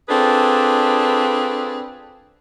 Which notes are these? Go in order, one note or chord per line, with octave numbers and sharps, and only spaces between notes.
C4 D4 F4 G#4 A4 B4